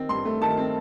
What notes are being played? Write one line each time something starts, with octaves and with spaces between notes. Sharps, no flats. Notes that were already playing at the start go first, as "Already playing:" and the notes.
Already playing: D#3 C4
G2 C6
A3
D#3 A5
C4